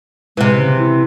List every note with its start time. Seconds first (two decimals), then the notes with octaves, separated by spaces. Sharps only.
0.37 C3 E3 G#3
0.58 C#3
0.78 E4